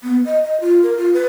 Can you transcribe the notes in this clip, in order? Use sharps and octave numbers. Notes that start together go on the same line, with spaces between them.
B3
D#5
D#5
F4
A#4
F4
B4